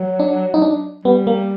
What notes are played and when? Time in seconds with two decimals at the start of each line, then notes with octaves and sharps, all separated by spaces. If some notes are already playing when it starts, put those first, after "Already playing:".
Already playing: F#3
0.19 D4
0.54 D#4
0.62 D4
1.05 G3 B3
1.27 A#3